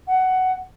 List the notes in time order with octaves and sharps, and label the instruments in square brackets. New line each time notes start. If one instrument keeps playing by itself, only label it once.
[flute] F#5